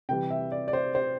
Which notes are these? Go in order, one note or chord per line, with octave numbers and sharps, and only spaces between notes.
C3 E3 G3 G5
E5
D5
D5
C5
C5